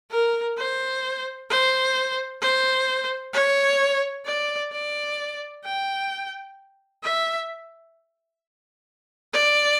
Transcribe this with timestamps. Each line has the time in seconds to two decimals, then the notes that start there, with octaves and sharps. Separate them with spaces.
0.11 A#4
0.57 C5
1.50 C5
2.42 C5
3.34 C#5
4.26 D5
4.72 D5
5.64 G5
7.04 E5
9.34 D5